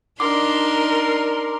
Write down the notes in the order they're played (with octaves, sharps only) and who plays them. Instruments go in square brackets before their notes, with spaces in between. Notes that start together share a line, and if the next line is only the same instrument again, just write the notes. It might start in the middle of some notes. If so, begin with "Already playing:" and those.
[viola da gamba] D4 D#4 [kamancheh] A#4 [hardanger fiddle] C6 [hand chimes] D6